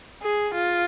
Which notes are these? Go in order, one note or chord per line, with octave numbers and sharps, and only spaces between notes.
G#4
F4